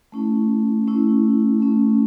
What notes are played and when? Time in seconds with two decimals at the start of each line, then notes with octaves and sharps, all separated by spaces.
0.12 A3 C#4 E4
0.87 A3 C#4 E4
1.60 A3 C#4 E4